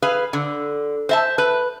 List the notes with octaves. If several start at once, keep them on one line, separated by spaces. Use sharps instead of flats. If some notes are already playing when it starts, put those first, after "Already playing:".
G#4 B4 F5
D3
C5 E5 A5
B4